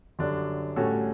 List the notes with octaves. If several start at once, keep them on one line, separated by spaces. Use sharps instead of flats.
F#2 D3 G3 D4
A2 G3 C#4 F#4 A4